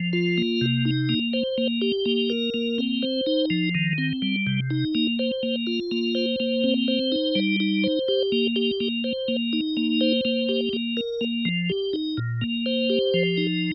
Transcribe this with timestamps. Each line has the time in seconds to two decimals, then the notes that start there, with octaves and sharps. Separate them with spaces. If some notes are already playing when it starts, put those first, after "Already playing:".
Already playing: F3
0.13 F4
0.38 A#3
0.61 C3
0.85 D#4
1.09 A#3
1.33 C5
1.58 A#3
1.82 G4
2.06 A#3
2.30 A#4
2.54 A#3
2.78 C4
3.02 C5
3.26 D#4
3.50 F3
3.75 D#3
3.98 C4
4.22 G3
4.47 C3
4.71 D#4
4.95 A#3
5.19 C5
5.43 A#3
5.67 F4
5.91 A#3
6.15 C5
6.40 A#3
6.64 C4
6.88 C5
7.12 D#4
7.35 G3
7.60 D#4
7.84 C5
8.08 G4
8.32 A#3
8.56 G4
8.80 A#3
9.04 C5
9.28 A#3
9.53 D#4
9.77 A#3
10.01 C5
10.25 A#3
10.49 G4
10.73 A#3
10.97 A#4
11.21 A#3
11.45 F3
11.70 G4
11.93 D#4
12.17 A#2
12.41 A#3
12.66 C5
12.90 G4
13.14 F3
13.38 D#4